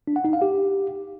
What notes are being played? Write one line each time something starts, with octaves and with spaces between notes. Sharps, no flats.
D4
F#5
D#4
F5
G4